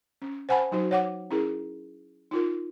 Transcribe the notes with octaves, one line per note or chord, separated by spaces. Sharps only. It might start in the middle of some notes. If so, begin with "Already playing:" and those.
C#4
C5 F#5 G#5 A5 B5
F#3 D#4 F#4 C5
C#5 F#5 D6
C#4 E4 G#4 A#4
D#4 F4 A#4